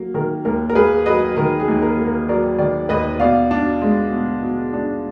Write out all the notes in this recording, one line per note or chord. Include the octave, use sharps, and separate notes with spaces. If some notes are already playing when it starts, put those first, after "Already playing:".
Already playing: F#3 A#3
D#3 A#4
D#2 A#4
A#4
A#3 G#4 B4
F#3 B4 D#5
D#3 A#4
G#4
D#2
A#4
A#3
A#4
F#3 A#4 D5
D#3 A#4 D5
D#2 B4 D#5
B2 D5 F5
D4
G#3
B2
B2
D4